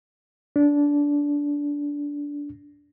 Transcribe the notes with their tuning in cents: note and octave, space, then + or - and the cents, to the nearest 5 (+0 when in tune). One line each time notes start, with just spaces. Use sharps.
D4 -20